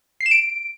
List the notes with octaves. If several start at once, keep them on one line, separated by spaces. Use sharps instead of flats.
C7
E7
D7